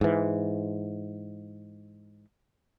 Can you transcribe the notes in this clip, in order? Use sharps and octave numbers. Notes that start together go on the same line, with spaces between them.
G#2 E3